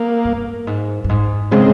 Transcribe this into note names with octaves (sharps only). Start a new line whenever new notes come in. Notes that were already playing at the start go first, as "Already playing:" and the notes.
Already playing: A#3
G2
G#2
G2
G#2
C#3 G#3 C4